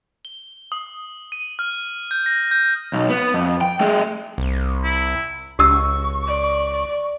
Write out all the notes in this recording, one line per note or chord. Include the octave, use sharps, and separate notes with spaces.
G7
D#6
D#7
F6
G6
A#6
G6
B1
B3
F2
G5
A3 G#4
C2
E4
C#2 G4 C#6 E6
D5